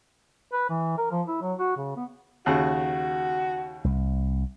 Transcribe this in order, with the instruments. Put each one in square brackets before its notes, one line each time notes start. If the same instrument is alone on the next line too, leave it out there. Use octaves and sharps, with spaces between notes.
[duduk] B4
E3
A#4
F3
E4
F#3
F#4
C#3
B3
[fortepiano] D#2 C#3 [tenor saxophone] F#4
[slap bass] C2